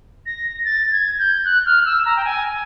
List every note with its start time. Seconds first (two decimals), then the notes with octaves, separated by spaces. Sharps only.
0.26 A#6
0.65 A6
0.91 G#6
1.19 G6
1.45 F#6
1.66 F6
1.85 E6
2.06 A#5
2.16 G5
2.24 G#5